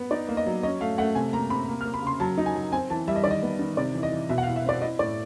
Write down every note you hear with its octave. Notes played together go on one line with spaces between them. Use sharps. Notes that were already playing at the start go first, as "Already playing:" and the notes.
Already playing: B3
D#4 D5
A#3
D#5
F#3
C#4 D#5
A3 F5
A3 F#5
C3 G#5
A#3 A#5
C3 B5
A#3
F6
A#3
B5
C#3 C6
F#3 A5
D#4
G#5
F#3
C4 G#5
E3 A5
G3 E5
D#5
D#3 D5
D#5
B3
D#3
C3 D5
E3
D#5
E3
B2 E5
F#5
F5
E4
E5
C4 D5
E4 D#5
A2 D5